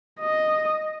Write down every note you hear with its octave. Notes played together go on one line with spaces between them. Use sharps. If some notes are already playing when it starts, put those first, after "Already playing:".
D#5